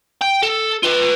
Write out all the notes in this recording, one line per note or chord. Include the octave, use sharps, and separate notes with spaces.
G5
A4
F4 B4